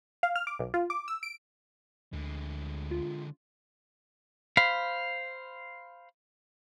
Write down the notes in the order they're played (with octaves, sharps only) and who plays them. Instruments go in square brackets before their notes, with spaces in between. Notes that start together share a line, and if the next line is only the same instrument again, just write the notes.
[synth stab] F5
F6
D6
B1
F4
D6
E6
D7
[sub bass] D2 [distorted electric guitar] D3 G#3
[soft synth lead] F4
[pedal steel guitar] C5 F5 B5